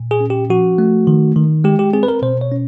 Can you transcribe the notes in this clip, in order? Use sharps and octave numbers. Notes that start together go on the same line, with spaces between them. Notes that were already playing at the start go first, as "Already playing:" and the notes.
Already playing: A#2
G#4
C#4
G4
F3 F#4
A3
D#3
D#3
G#3 G4
G4
C4 G#4
B4
A#4
B2 C5
C#5
C#4